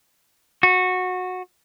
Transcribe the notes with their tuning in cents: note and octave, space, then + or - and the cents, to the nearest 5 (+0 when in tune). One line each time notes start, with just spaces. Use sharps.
F#4 -15